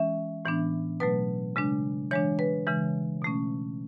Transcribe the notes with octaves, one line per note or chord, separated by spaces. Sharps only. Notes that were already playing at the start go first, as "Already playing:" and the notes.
Already playing: E3 G#3 C#4 E5
A2 E3 B3 D4
B2 F#3 A3 B4
C#3 G#3 D4
E3 G#3 D4 C#5
B4
C#3 E3 G#3
B2 A3 C#4